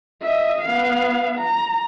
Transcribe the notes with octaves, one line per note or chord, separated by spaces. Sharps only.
D#5 E5
B3 F5
A#5